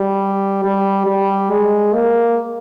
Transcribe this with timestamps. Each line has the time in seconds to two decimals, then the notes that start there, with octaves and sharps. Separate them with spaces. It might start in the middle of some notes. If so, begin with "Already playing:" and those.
Already playing: G3
0.64 G3
1.06 G3
1.51 G#3
1.94 A#3